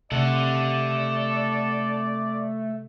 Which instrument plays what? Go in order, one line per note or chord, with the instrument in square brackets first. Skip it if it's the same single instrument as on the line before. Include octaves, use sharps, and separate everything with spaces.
[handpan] C3 [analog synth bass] A3 [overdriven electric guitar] A4 F#5 [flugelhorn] D5